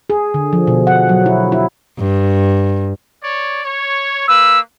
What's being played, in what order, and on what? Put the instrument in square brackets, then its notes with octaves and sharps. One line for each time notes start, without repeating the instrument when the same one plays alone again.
[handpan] G#4
D3
F3
B2
F#5
F#3
E4
E4
[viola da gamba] G2
[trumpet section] C#5 D5
C#5
[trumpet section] A#3 B4 [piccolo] E6